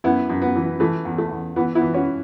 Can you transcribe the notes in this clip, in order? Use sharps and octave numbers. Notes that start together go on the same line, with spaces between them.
F#2 B3 E4
F#2
B3
E3
E3 A3
E2
A3
E2
E3 B3
B3 E4
E3
C#4 F#4